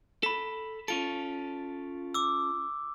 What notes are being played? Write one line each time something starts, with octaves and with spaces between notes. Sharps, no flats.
A4 B5 B6
C#4 F4 A4 D7
D6 E6